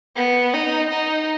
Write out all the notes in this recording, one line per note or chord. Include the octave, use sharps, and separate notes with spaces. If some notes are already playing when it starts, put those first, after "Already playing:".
B3
D#4
D#4